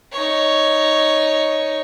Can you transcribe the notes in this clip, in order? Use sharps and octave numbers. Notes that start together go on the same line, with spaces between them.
D#4 C#5